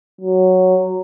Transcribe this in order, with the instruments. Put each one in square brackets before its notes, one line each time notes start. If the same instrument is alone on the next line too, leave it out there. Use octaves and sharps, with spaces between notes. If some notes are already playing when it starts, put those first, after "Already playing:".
[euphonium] F#3